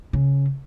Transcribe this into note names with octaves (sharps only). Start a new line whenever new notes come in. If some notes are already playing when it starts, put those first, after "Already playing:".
C#3